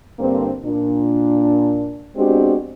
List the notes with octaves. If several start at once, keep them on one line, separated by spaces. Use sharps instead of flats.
G2 D3 A#3 C4
A#2 D4
G#3 B3 C4 D4 F#4 G4